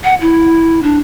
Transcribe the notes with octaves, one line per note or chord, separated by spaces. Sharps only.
F#5
E4
D4